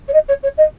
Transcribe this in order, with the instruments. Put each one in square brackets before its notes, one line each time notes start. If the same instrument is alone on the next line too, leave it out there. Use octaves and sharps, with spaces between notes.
[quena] C#5
D#5
C#5
C#5
D#5